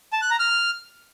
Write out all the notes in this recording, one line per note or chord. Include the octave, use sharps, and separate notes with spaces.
A5
F#6
A#5
F6